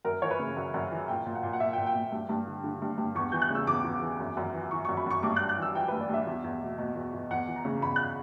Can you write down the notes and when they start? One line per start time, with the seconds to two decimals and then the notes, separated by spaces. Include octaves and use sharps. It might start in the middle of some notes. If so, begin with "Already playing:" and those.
0.05 F#2 A#4
0.22 E3 C#5
0.31 B4
0.39 C#3
0.56 F#2
0.74 F#2
0.91 E3
1.08 A#2 G5
1.26 A#2
1.35 F#5
1.43 A#2
1.53 F#5
1.60 A#2 E5
1.73 G5
1.78 A#2
1.86 G5
1.95 A#2
2.12 G2
2.29 G2
2.47 D3
2.63 D3
2.82 G2
2.98 G2
3.15 E2 C#6
3.32 E3 G6
3.42 F#6
3.50 C#3 E6
3.67 E2 D6
3.84 E2
4.02 E3
4.20 F#2
4.37 F#2
4.54 E3
4.71 E3 C#6
4.85 F#2 C#6
4.97 B5
5.06 F#2 C#6
5.23 G2 D6
5.36 F#6
5.41 G2
5.49 F#6
5.58 E3 E6
5.75 E3 G5
5.88 G2 B4
6.01 D5
6.09 G2 E5
6.27 E2
6.44 E2
6.61 B2
6.78 B2
6.96 E2
7.13 E2
7.31 E2 F#5
7.48 E3
7.56 A#5
7.65 C#3
7.82 E2 B5
7.96 F#6